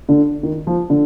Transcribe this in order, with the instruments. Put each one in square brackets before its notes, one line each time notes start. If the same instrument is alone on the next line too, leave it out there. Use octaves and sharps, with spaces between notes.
[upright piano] D3
D#3
F3
D3